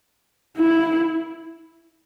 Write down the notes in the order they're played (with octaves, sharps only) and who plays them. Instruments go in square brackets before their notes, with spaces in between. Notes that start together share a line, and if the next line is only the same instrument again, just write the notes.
[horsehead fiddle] E4